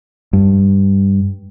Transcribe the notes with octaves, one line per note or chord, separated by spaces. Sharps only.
G2